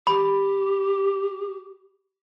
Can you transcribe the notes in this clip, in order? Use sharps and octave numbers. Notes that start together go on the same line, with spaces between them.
G4 B5